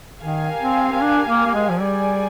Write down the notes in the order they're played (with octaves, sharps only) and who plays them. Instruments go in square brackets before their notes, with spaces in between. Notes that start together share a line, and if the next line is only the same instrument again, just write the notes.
[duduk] D#3 [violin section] G4 A#4 F5 G#5
[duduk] C4
C4
D4
A#3
A#3
G#3
F3
[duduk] G3 [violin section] G#4 D5 G#5